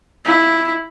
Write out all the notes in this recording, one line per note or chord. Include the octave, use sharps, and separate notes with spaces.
E4